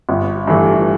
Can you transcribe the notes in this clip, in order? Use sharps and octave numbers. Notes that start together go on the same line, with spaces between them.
G1
G2 E3 A3